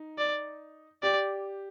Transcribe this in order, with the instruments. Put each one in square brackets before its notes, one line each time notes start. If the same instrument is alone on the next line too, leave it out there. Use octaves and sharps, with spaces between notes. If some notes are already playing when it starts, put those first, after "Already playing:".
Already playing: [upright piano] D#4
[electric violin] D5
[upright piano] G4 [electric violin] D5